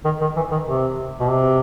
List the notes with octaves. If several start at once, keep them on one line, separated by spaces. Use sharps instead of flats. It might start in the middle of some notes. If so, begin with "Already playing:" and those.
D#3
D#3
E3
D#3
C3
B2
C3